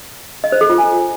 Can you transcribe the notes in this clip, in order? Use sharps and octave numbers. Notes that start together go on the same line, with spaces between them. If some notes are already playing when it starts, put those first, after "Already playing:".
D#5
C5
A4
F4
G#5